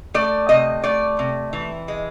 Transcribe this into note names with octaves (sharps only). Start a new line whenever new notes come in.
A3 D5
C3 D#5
A3 D5
C3
E3
G#3